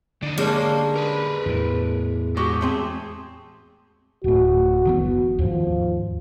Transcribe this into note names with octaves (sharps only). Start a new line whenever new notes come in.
D3 D4 D#4
G3 G#3 A#3 C#4 D4
A#4 B4
E2 A2 E3
G#2 F#4 G4
A3 C4 G#4
D1 A2 F#4
F#1 E3 B3
D#2 G#2 F3